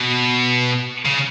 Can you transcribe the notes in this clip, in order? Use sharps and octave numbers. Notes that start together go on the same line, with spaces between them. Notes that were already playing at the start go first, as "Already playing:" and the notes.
Already playing: B2
C#3